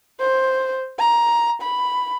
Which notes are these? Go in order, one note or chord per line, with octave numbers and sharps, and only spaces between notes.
C5
A#5
B5